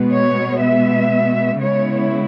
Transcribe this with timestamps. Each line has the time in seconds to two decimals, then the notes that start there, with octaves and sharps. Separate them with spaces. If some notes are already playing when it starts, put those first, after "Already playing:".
Already playing: B2 G#3 B3
0.12 C#5
0.61 E5
1.61 C#3 G#3 B3 E4 C#5